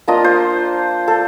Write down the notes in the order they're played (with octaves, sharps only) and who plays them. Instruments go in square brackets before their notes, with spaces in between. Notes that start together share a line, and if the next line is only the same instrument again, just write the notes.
[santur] A#3 D4 F4 D#5
C5
A4